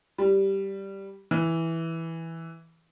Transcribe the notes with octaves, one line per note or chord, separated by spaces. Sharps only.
G3
E3